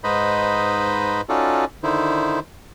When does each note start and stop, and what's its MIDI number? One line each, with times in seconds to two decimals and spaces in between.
0.04 1.21 44
0.04 1.21 63
0.04 1.21 71
0.04 1.21 72
0.04 1.21 75
0.04 1.21 83
1.29 1.65 61
1.29 1.65 63
1.29 1.65 65
1.29 1.65 66
1.29 1.65 69
1.29 1.65 74
1.83 2.39 50
1.83 2.39 51
1.83 2.39 63
1.83 2.39 64
1.83 2.39 72